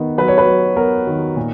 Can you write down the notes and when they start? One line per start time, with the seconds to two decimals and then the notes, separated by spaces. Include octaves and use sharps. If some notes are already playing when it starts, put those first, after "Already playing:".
Already playing: D#3 B3 D#4
0.18 F#3 B4
0.28 C#5
0.38 B4
0.48 F#3
0.77 B3 A#4
1.07 D#3
1.37 A#2